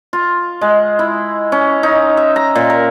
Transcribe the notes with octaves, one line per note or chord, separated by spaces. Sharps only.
F4
G#3
E4
C#4
D#4
E5
A#5
A#2
A#4